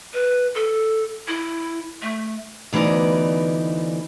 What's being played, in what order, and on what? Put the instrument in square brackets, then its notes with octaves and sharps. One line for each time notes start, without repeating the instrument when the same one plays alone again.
[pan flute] B4
A4
E4
A3
[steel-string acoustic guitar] D2 E3 B3 D#4 D5